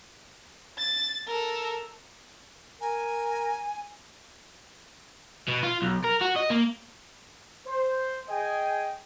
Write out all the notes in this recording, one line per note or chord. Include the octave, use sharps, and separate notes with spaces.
A6
A4 A#4
A#4 G#5
B2
F4
B1
A#4
F#4
D#5
A#3
C5
G#4 D#5 G5 G#5